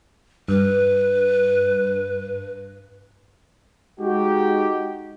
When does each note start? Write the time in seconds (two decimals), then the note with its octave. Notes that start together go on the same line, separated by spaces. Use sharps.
0.48 G2 B4
4.00 G#3 D#4 F#4 G4